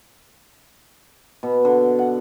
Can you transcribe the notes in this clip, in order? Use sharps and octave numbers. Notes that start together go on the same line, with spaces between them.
B2
D3
F#5